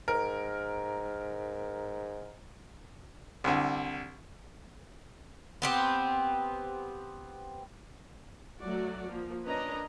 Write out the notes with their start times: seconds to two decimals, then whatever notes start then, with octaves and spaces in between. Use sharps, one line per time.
0.08 G#2 A#4
3.44 C2 D3
5.62 B3 C4 G4
8.60 F#3 A3 F#4 D5
9.07 F3 A#3
9.46 C#4 D4 A#4 B4 D#5 A#5